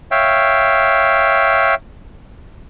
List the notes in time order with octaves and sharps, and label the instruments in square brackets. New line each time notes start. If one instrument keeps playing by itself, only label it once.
[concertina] C#5 E5 F5 G5